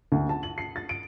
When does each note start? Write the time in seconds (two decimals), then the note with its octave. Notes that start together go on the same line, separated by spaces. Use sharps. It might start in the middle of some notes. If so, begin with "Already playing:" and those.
0.12 D2
0.29 A5
0.43 F#7
0.58 C7
0.76 A6
0.89 D7